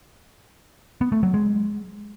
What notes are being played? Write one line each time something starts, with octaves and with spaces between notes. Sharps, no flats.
B3
A3
F#3
G#3